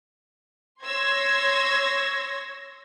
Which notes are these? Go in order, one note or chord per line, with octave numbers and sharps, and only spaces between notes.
C#5 C6 E6 G#6 A#6